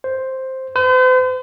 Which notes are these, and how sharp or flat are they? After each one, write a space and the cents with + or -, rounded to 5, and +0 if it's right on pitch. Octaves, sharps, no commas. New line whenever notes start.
C5 +5
C5 -45